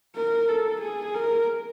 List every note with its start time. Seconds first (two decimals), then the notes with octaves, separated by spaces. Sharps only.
0.16 A#4
0.49 A4
0.82 G#4
1.15 A#4